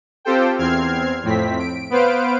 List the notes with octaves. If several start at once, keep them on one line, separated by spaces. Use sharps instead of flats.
C4 F4 G4 A4 C5 G5
E2 C4 F6 G#6 C7
F2 A2 C4 B6
D7
B3 B4 C5 F5 D7